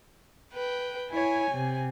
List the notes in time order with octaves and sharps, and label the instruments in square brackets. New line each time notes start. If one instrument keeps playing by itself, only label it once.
[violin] B4 G5
[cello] E4 C#5 [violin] G#5
[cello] C3